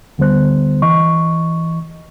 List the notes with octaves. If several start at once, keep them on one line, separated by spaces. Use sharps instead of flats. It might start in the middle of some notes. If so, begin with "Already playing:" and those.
D2 D3 G3 B3 C5 F#6
E3 D#5 C#6